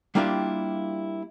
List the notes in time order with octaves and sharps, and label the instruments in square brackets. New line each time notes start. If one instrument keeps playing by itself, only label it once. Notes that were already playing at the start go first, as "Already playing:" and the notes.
[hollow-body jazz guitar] G3 A#3 D4 E4 F4 G4